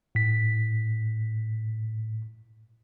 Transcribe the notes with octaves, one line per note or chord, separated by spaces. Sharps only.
A2 B6